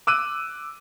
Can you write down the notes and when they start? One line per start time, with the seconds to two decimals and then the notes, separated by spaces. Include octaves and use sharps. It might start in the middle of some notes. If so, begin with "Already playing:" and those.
0.07 D6 E6 F#6 D#7